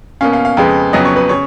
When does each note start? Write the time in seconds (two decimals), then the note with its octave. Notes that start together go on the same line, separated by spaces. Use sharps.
0.21 B2 A#3 C#4 F5
0.33 F5
0.45 F5
0.57 F2 C#3 G#3 B3
0.93 F2 C#3 F#3 B3 D#5
1.05 C#5
1.16 B4
1.29 C#3 C#5